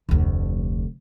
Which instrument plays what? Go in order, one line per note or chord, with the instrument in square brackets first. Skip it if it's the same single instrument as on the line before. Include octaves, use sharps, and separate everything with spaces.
[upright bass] F1 D2